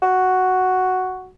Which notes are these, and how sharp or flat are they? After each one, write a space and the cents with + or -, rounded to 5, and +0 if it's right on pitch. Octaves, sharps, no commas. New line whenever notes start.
F#4 +0